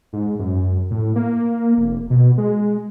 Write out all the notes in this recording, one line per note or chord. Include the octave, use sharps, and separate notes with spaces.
G#2
F#2
A2
A#3
F1
B2
G#3